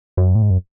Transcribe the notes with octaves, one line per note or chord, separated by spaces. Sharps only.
F#2
A2
G#2
F#2